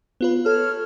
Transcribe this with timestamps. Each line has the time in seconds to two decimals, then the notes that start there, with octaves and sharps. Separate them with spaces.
0.21 B3 F4 B4
0.46 A4 C#5 F6